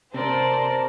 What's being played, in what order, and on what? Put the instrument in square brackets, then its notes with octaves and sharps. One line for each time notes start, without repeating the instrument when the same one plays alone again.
[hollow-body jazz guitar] C3 [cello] A#4 [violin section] C5 D5 [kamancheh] A5